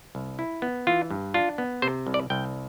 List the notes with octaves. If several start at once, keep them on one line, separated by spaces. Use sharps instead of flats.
C2
E4
B3
E3 F4
G2
D4 F4
B3
C3 C5
C2
D5
C2 G5